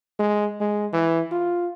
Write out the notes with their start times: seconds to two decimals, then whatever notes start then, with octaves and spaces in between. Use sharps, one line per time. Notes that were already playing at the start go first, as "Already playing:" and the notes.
0.19 G#3
0.61 G#3
0.93 E3
1.32 F4